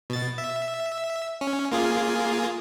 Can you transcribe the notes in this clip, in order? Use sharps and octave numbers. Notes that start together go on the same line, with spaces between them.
B2 A6
E5
C#4
A#3 F4 G#4